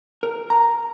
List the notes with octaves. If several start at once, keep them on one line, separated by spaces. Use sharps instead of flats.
A#4
A#5